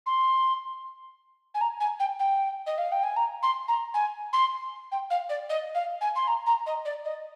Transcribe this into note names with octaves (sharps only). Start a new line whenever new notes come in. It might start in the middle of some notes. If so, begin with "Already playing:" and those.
C6
G#5
A#5
G#5
G5
G5
D#5
F5
G5
G#5
A#5
C6
A#5
G#5
C6
G5
F5
D5
D#5
F5
G#5
C6
A#5
A#5
D#5
D5
D#5